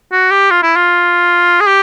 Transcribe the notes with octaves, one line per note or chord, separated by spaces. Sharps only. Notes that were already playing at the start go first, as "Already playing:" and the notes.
F#4
G4
F4
E4
F4
G#4
G4